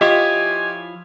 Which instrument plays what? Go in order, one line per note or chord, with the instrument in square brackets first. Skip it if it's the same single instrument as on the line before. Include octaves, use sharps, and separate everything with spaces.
[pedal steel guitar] F3 E4 C#5 [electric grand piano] F4 G4 [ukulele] D#5 [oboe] G#5